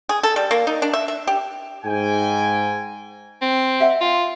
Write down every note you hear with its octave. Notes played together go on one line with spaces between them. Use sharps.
G#4
A4
G3
A#3
D#4
D4
E5
E5
G4
G#2 G5 G#5
C4
D#5 E5 F#5
F4